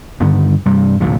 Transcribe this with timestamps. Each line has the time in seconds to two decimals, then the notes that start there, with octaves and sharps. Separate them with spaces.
0.20 G2 D3 D#3 B3
0.66 G2 C3 G3
1.00 D1 A#1 D#2 C3